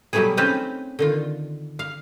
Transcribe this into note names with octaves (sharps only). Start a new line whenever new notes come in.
B2 F#3 G3 A3 B3 G#4
C4 C#4 D#4 B4 C5 F5
D3 D#3 F4
F5